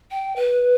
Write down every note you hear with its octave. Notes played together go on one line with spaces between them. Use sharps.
G5
B4